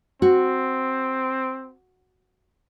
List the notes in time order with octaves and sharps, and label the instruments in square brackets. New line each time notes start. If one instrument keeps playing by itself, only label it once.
[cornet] C4 [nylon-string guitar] F#4